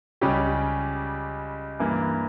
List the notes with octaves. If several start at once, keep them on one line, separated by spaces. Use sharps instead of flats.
C#2 C#3 G3 C#4 G4
G2 E3 A#3